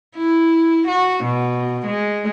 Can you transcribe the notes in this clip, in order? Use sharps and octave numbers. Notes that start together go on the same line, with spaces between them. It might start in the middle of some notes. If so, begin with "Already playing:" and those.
E4
F#4
B2
G#3